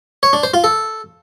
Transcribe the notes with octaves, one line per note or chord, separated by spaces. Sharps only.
C#5
D4
C5
F4
A4